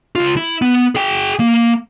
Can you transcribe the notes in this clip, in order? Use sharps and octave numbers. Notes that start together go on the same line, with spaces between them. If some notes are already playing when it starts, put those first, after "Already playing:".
C#2 F4
E4
B3
G#4 G5
A#3